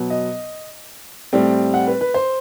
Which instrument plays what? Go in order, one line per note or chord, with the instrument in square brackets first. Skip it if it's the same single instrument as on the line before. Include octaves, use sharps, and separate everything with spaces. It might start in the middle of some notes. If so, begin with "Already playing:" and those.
Already playing: [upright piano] B2 F#3 B3
D#5
A2 G3 C4
F#5
B4
B4
C5